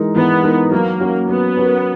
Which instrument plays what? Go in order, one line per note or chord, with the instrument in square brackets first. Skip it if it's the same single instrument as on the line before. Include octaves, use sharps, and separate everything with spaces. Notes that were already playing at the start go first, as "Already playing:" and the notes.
Already playing: [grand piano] E3 G#3 D#4 A#4
[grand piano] E3 [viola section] B3
[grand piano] G#3 D#4 A#4
[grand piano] F#3 [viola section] A#3
[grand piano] C#4 F#4 A#4
[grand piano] F#3 [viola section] B3
[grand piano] C#4 F#4 A#4